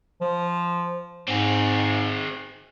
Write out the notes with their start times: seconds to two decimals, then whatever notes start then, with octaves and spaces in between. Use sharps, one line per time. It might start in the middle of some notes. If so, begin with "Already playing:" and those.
0.21 F3
1.28 G#2 C4 G#4